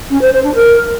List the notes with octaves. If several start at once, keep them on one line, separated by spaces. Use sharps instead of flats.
C#4
C5
C5
D4
A#4